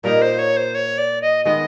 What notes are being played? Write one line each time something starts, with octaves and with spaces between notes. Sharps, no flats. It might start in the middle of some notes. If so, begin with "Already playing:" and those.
A#2 G3 A#3 D#4 A#4
C5
C#5
C5
C#5
D5
D#5
D#3 G#3 B3 D#5